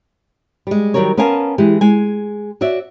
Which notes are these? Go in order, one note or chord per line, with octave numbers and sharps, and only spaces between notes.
G3 G#3
D#3 E3 F#3 G3 A#4 C#5
B3 C#4 A#4 F5 G#5 A5
E3 G#3 G4
G#3 G#5
F#4 C#5 D5 E5